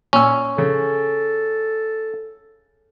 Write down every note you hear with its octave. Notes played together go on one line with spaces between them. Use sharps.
A#2 C#4 E6
C#3 A4